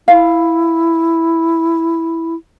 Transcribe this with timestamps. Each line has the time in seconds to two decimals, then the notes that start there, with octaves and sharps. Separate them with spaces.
0.08 E4 F5